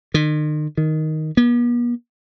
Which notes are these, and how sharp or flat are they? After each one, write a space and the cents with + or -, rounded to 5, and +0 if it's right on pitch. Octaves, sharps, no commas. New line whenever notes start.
D#3 -40
D#3 +5
B3 -45